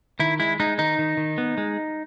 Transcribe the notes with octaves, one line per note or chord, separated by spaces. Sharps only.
D#3 E4
G#3 E4
G#3 D#4
D#3 D#4
D#3
D#3
B3
G#3